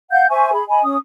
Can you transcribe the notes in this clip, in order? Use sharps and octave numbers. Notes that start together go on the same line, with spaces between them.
F5 F#5 G6
C5 E5 G#5 C#6
G#4 B5
D#5 G#5 B5
C#4 D#6